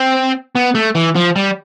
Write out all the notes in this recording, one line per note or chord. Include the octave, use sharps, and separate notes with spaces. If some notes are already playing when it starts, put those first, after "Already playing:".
Already playing: C4
B3
A3
E3
F3
G3